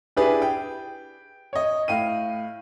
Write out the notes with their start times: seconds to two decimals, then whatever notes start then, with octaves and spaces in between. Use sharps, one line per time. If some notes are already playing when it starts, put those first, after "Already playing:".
0.17 D4 E4 G4 G#4 B4
0.42 G5
1.53 C#5 D#5
1.88 A2 F5 G5 D#7